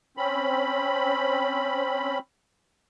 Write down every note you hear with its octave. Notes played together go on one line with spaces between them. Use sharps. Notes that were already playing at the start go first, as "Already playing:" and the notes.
C4 C#4 B5